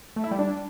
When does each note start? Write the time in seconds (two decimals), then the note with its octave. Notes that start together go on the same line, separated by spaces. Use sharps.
0.16 A3
0.24 E4
0.31 G3
0.39 D4